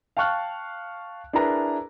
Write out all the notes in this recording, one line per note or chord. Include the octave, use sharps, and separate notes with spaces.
F5 G5 A5 C#6 F6 F#6
D4 E4 G#4 A#4 B4 A#5